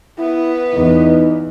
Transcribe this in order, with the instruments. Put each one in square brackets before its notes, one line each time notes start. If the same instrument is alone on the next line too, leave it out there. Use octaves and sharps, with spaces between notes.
[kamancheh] B3 B4 [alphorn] E4
[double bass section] E2 E3 [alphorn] D#4